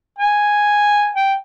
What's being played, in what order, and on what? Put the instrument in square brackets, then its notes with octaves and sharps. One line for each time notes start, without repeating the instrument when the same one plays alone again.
[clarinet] G#5
G5